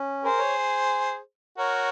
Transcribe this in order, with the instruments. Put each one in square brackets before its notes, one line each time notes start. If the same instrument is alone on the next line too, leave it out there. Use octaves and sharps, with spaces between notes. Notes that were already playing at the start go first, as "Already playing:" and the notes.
Already playing: [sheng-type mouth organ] C#4
[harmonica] G#4 C5 [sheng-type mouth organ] A#4
[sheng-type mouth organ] C#5
[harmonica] F#4 A#4 [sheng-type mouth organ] C#5